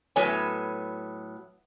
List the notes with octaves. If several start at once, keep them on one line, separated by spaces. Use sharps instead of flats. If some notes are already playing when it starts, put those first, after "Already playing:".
A2 F#3 B3 A4 C#5 G#5